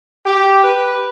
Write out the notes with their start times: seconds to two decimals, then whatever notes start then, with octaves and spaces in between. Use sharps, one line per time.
0.25 G4
0.63 B4